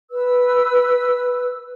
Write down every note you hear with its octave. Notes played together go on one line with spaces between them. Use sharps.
B4 E6